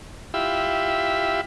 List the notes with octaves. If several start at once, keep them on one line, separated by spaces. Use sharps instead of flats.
E4 F4 G4 E5 B5